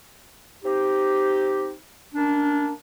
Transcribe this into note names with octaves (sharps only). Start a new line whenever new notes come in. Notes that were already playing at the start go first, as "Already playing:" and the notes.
C4 D#4 G4
A#3 C#4 D4